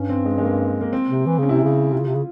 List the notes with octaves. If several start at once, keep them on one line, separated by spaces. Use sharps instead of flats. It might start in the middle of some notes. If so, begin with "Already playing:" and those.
Already playing: G2 C#4
C4
G#3
G#3
A#3
A#3
C4
C3
E3
C#3 C#4
C3 E4
C#4
C#3
C3 F4
C#3
C3
C#3